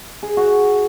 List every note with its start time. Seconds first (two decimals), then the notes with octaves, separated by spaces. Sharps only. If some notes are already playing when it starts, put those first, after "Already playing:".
0.23 G#4
0.37 F#4